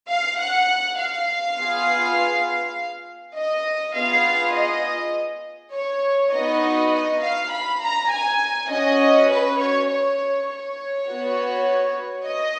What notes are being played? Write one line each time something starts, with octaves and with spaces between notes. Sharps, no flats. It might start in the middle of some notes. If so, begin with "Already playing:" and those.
F5
F#5
F5
B3 F4 G#4
D#5
B3 F4 G#4 F5
D#5
C#5
B3 D#4 F#4 D#5
D#5
F5
B5
A#5
G#5
C#4 F#4 D#5
B4
C#5
C#5
C#5
B3 F#4
D#5